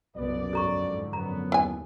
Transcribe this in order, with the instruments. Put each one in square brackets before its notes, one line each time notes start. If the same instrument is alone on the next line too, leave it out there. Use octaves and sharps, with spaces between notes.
[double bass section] C2 B2 B3 [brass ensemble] F#2 D5
[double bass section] F2 G#2 D3 [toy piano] A4 A#5 C#6
[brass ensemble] F#2 B3 [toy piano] A#5
[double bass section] D#2 [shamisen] E4 G#5